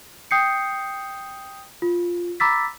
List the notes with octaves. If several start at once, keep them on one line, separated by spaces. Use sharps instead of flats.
G5 D#6 G6 C7 C#7
F4
A#5 B5 D6 E6 A6 B6